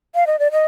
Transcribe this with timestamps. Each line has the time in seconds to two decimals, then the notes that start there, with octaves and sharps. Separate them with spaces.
0.15 F5
0.27 D#5
0.39 D5
0.52 D#5